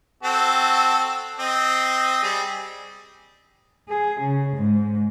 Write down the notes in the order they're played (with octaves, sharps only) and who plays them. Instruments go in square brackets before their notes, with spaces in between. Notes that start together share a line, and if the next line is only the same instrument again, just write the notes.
[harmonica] C4 F#4 A4
C4 D#5
G3 G#4
[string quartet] G#4
C#3
G#2